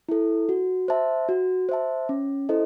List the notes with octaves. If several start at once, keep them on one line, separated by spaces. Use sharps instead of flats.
E4 A4
F#4
C5 E5 A5
F#4
C5 E5 A5
C#4
E4 A4 C5 D#5